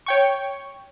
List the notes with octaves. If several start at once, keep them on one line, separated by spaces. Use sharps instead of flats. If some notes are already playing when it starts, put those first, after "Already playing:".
C#5 G5 C#6